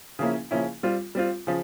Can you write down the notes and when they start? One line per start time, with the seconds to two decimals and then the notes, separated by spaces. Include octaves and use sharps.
0.19 C#3 F3 A#3 C#4 E4
0.51 C#3 F3 A#3 C#4 E4
0.83 G3 C4 F4
1.15 G3 C4 F4
1.47 C#3 F3